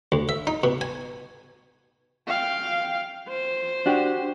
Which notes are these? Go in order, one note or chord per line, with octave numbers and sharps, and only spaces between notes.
D2
E5
D#4
B2
G#5
F5 G5
C5
D4 F#4 G4